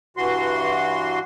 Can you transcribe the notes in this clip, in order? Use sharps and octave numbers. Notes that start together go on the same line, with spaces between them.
G2 E3 F#4 C6